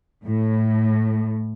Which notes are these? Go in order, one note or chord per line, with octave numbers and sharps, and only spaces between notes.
A2